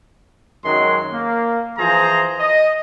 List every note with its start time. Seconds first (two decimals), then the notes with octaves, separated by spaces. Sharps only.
0.65 F#2 D#3 F#3 G#3 C6
1.12 A#3
1.78 E3 F3 G#4 C5 A#5
2.39 D#5